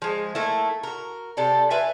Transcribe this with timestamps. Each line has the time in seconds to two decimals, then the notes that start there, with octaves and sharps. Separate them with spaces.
0.02 F3 G#3
0.35 A3 A#3 E4
0.83 F#4 A#4
1.37 C3 G4 A4 D5
1.71 B4 E5 F5 G#5